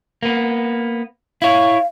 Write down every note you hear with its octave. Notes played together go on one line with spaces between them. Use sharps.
A#3 B3
E4 C#5 F5